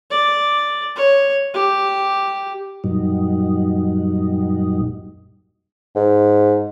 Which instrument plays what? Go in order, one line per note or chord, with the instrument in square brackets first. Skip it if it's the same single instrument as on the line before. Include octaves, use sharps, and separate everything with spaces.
[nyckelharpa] D5
C#5
G4
[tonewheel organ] F#2 A#2 F#3 G3 D#4
[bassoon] G#2